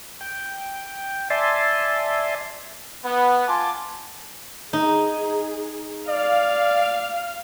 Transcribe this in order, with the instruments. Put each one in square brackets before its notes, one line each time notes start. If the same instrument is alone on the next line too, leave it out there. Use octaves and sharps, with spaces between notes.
[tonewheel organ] G5
D5 E5 G#5 A5 C6
[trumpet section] B3
F4 G#5 A5 C6 D6
[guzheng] D#4 [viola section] G#4
[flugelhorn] D5 [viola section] F5